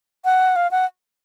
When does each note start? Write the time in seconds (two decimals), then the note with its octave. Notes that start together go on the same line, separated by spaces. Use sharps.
0.25 F#5
0.56 F5
0.71 F#5